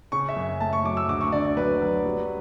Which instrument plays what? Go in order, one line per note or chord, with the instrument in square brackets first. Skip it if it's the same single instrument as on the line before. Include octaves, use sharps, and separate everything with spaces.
[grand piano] C#3 C#6
E5
F#2
A3 A5
C#6
F#3 D6
E6
D2 D6
C#6
D3 D5
D5
F#3 B4
F#3
G3